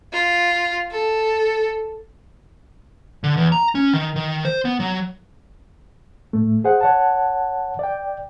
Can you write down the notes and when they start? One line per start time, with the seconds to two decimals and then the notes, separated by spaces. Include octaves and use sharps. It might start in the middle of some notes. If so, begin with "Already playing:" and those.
0.13 F4
0.91 A4
3.24 D3
3.37 E2
3.52 A#5
3.75 C#4
3.93 D#3
4.16 D#3
4.45 C5
4.65 B3
4.80 F#3
6.33 A2 A3
6.64 G#4 C5 F#5
6.81 C#5 F#5 A5
7.79 D5 G5